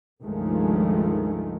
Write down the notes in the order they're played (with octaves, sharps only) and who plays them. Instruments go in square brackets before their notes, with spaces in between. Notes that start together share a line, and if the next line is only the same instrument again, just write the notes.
[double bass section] C#2 G2 D#3 F3 G#3 A3